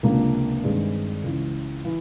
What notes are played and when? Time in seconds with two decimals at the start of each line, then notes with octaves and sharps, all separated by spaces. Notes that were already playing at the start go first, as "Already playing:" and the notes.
0.03 C#2 C3 F3 A#3 D4
0.64 G2 D#3 G#3 C4
1.24 C#2 C#3 E3
1.85 E3